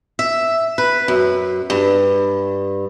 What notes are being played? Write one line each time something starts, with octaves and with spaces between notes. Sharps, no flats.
E5
B4
F#2
G2